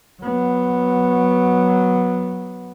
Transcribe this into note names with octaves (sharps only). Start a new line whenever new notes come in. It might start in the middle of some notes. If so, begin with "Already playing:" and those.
F#3 B3